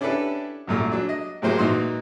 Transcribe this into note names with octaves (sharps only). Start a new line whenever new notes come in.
C#4 D4 E4 G4 A4 B4
C2 F#2 A#2 A3
F#3 D4
D#5
A2 C3 F#3 G#3 A#3 C5
A#2 E3 D#4 F#4 C6